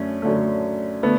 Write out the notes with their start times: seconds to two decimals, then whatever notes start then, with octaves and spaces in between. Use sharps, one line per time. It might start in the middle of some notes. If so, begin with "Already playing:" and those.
Already playing: F#2 D3 A3 C#4
0.22 F#2 D3 A3
1.03 D3 A3 B3